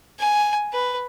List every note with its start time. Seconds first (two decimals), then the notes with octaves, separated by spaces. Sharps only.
0.19 G#5
0.73 B4